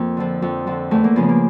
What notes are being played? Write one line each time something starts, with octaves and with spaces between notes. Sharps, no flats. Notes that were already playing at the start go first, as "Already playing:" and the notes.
Already playing: F2 A#3
D3 F3
F2
D3 F3
E2 A3
A#3
C#3 F3 B3
A#3